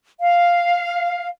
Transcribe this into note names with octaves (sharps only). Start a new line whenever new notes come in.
F5